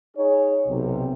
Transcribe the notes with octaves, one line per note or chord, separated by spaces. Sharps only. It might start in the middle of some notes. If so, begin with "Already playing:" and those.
D#4 G#4 C#5
B1 C3